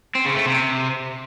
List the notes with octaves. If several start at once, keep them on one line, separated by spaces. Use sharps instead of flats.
C4
C#3
A3
C3